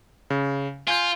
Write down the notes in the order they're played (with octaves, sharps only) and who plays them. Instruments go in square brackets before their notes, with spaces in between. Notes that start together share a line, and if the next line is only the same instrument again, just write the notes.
[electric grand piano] C#3
[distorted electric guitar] F4 [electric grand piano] G#5 G6